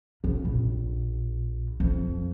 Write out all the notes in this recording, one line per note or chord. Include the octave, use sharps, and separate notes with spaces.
F2
A#1
F2